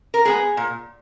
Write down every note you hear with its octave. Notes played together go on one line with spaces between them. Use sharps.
A#4
G#3 B3 G#4
A#2